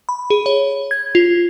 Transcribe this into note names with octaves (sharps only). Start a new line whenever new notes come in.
B5
G#4
C#5
G#6
F4